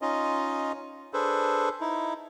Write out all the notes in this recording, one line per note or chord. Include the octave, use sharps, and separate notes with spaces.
C#4 D#4 F4 D#5
D4 G#4 A4 B4 C5
D#4 E4